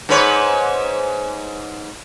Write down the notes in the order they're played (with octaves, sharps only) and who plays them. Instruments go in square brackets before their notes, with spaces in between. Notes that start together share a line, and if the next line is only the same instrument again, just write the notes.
[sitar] G#2 B4 C#5